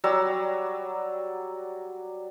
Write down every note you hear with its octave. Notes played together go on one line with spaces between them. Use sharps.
F#3 G3 A#5 E6